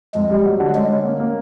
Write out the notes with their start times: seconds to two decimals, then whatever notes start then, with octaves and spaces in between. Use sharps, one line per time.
0.15 F2 G#3
0.30 G3
0.45 F#3
0.60 D3
0.75 G#3 C#4
0.90 C#4
1.05 A#3
1.20 A#3